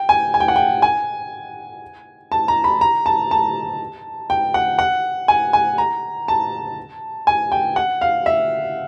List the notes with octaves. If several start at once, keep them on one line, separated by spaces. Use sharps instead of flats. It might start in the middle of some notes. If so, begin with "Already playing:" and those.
Already playing: G5
G#5
G#5
G5
F#5
G5
G#5
A5
A#5
B5
A#5
A5
A5
G5
F#5
F#5
G#5
G#5
A#5
A5
G#5
G5
F#5
F5
E5